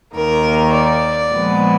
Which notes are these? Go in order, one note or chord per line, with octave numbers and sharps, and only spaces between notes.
D#2 D#3 A#3 A#4
D5
A#2 F3 G#3 B3